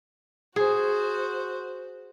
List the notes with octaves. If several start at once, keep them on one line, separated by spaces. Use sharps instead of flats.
F#4 G#4 C5